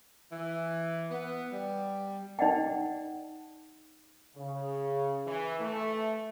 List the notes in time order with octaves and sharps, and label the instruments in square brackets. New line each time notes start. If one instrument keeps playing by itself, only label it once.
[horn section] E3
B3
G3
[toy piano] D#4 D5 D#5 F#5 G5
[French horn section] C#3
E3
A3